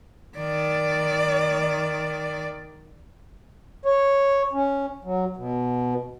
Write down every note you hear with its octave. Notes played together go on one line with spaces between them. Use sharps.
D#3 D5
C#5
C#4
F#3
B2